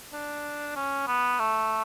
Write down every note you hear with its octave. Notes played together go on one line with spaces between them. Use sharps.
D4
C#4
B3
A3